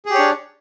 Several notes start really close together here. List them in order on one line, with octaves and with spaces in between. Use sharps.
G#4 G4 C#5 D4